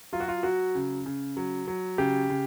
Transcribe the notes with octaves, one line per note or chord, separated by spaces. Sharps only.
F#3 F4
F#4
F4
F#3 F#4
C#3
C#3
F#3
F#3
C#3 G4
C#3